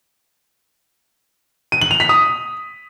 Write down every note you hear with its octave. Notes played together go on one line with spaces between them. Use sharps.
D#7
F#7
F7
B6
D#6